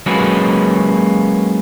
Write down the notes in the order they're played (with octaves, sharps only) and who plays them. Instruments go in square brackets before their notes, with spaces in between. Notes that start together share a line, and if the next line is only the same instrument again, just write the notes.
[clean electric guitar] F#3 G#3 A#3 C#4 F#4 B4